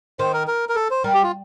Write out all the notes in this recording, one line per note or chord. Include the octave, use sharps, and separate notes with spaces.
D#3 C5
A#4
A#4
A#4
A4
C5
G3 A#4
G4
F4